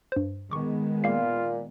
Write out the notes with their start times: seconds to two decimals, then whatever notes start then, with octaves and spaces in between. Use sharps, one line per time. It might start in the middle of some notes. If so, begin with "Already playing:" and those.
0.12 G2 C5
0.51 D#3 G#3 B3 C#6 D6
1.04 A#2 A#3 F4 C7